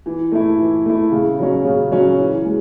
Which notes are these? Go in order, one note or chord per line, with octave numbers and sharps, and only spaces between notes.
E3
A3 E4
E3
A3 E4
C#3
F#3 C#4
C#3
F#3 C#4
E3
G#3